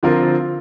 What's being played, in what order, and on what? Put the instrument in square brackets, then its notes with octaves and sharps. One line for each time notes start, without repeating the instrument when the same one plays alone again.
[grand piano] D3 F3 C4 F4 A#4